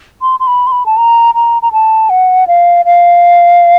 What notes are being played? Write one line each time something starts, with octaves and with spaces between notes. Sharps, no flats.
C6
C6
B5
C6
B5
A5
A#5
A#5
A#5
A5
F#5
F5
F5